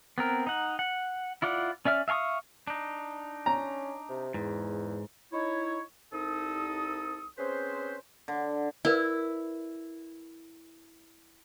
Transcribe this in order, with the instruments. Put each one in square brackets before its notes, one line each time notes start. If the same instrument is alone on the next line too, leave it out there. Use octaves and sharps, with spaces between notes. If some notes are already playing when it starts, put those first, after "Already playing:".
[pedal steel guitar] B3 C4 A#4
D#4 F#5
F#5
E4 F4 D5 F#5
C#4 D5 E5 F6
E5 F5 G#5 C#6 D#6
[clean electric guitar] D4 D#4
[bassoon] C#4 [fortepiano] A#5
[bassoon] C3
[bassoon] E2 [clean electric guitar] G#2
[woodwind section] D#4 E4 C#5
C2 D#4 A4 D#6
C4 C#4 G#4 B4 C5
[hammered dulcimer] D3
[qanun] E4 [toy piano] A#4 B4 D5